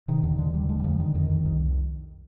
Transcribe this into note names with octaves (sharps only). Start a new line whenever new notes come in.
C3 D#3
D#2 D3
D3 D#3
D3 G3
D3 G#3
G3
F2 F3
D3 D#3
F2 D#3
F2
C2 D#3